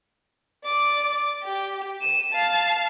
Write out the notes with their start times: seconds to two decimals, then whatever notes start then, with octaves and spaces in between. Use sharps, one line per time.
0.65 D5 D6
1.43 G4
2.01 D#7 E7
2.33 F5 A5